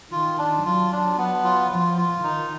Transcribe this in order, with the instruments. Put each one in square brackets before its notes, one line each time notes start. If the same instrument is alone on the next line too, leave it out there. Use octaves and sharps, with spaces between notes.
[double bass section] D#3 [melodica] F4
[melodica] D4
[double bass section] F#3 [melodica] F4
[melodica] D4
B3
F4
[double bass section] F3 [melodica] F4
[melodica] F4
[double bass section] D#3 [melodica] D#4